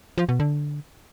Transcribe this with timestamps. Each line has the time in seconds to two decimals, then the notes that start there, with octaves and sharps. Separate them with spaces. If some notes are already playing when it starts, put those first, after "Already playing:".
0.18 F3
0.29 B2
0.40 D3